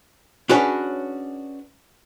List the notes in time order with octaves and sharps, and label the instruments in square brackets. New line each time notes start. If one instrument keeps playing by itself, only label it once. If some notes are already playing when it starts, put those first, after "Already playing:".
[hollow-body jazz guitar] C#4 D4 F#4 G#4 B4 C#5